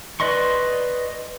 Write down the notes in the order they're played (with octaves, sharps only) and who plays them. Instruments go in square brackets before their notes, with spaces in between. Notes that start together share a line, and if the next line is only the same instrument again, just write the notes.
[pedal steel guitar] B4 D5 D#5 C6 C#6